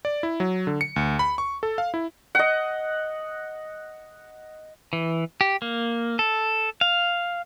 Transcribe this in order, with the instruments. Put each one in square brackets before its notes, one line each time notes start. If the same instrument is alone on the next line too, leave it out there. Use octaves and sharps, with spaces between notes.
[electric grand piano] D5
E4
F#3
D3
C#7
D2
B5
C#6
A4
F5
E4
[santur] D#5 F#5
[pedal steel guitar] E3
G4
A#3
A4
F5